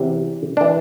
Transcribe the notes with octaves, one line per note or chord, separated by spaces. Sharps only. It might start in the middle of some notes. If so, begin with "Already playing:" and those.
Already playing: E2 C3 E3
E3 D4